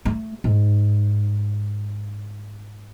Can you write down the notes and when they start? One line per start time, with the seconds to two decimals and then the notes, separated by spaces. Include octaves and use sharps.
0.05 A3
0.44 G#2